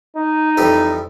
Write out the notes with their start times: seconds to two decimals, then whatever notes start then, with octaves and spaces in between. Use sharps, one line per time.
0.17 D#4
0.57 F2 E3 G3